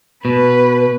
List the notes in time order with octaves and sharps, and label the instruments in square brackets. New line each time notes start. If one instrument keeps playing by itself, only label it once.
[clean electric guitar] B2 [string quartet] B4